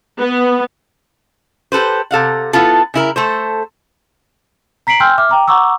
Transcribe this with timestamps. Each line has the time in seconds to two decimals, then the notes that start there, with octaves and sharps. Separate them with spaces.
0.19 B3
1.72 G4 A4 B4 C5
2.11 C3 A4 F5 F#5
2.53 B3 E4 F4 A4
2.94 C#3 E4 A#4
3.16 A3 A4 C5
4.87 A#5 B6 C7 D7 F#7
5.00 G5 G#5 C6 E6 F6 G6
5.18 E5 D6 F6
5.29 G5 A#5 D6
5.48 F#5 A#5 C#6 D6 E6